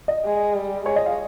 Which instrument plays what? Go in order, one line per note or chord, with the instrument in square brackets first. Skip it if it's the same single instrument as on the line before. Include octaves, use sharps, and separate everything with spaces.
[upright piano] D#5
[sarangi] G#3
G3
[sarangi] G#3 [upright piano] C#5
[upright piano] D#5
F5